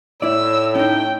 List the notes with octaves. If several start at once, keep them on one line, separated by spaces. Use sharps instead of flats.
A2 E4 C#5 D5 E6
C#4 D#4 G5